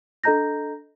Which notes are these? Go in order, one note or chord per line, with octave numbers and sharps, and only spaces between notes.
D4 A4 D#5 A#5 G6 A#6